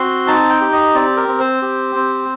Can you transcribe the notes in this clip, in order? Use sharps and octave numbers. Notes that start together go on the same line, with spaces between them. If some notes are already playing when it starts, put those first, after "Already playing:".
Already playing: C4 F#4 C6
D#4 A5
G5
G4
D#5
C4 D5
A#4
C4
C5
G4
C4